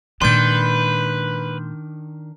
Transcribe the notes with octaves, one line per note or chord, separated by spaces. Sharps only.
A#2 D#3 G#3 D4 B4 C6 G6